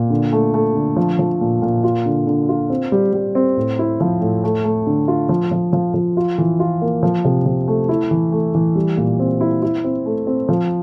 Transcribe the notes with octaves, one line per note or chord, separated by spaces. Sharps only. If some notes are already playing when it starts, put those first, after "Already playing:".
Already playing: A#2
D3
A3
A3
D3
F3
F3
A#2
A#2
F4
D3
D3
F4
C4
G3
G3
C4
A2
E4
F3
A2
A3
A3
D3
F4
F3
F3
F3
F3
F4
E3
F4
A#3
F3
C3
F3
A3
E4
E3
A3
E3
G3
A#2
C4
E4
E4
C4
A3
C4
F3